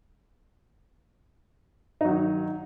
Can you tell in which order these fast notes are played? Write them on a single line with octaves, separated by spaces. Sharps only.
D#4 F#3 D#3